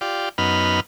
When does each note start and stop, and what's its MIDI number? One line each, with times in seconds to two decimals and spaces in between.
0.01 0.29 65
0.01 0.29 67
0.01 0.29 74
0.38 0.80 42
0.38 0.80 59
0.38 0.80 63
0.38 0.80 83
0.38 0.80 89